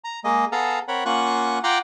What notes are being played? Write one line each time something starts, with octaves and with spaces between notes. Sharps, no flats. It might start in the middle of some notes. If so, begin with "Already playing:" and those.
A#5
G#3 A#3 D#5
B3 G#4 A4 F5 A5 A#5
C4 A#4 C#5 F#5 B5
A#3 C#4 F4 F#5 C#6 F#6
F4 F#5 G5 A#5 C6 D6